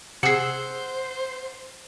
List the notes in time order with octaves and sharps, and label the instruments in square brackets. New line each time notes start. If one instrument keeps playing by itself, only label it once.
[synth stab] C3 G#4 [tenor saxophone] C5 [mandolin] F#5 E6 [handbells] C7 C#7